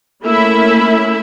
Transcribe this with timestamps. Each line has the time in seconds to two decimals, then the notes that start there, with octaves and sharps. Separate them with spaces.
0.24 A3 A#3 C#4 E4 E5 B5